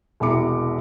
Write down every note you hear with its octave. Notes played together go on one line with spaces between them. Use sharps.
E1 C2 E4 A#5 D6 C#7